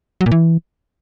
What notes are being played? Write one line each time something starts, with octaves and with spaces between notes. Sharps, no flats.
F#3
A#2
E3